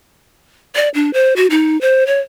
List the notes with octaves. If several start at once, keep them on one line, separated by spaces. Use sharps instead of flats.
D5
D4
C5
F#4
D#4
C5
C#5